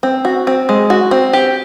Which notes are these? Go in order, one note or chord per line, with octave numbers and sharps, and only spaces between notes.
C4
F#4
C4
G#3
F#4
C4
G4